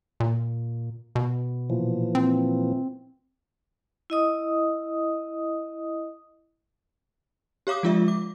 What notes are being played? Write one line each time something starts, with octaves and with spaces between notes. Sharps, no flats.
A#2
B2
A#2 E3 F3
C4
E4 D#5 D#6
G4 C#5 F5 D6 D#6
F3 G#3 F4 D5 E5
D6